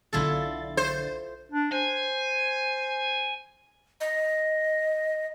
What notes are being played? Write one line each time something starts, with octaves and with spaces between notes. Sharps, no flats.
B1 D3 E4 F4 A4 A6
C5
D4
C5 G#5
D#5